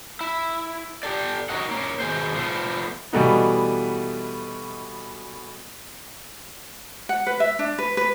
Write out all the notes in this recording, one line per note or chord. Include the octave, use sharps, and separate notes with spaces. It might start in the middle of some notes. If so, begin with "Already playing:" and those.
E4
G4 A4 D5
D#4 F#4 A#4 C#5 D#5 F#5
A#3 C#4
B2 D#3 G#4 C5
F3 A3 B3
B2 E3 G3 A3 B3 D#4
F#5
B4
E5
D4
B4
B4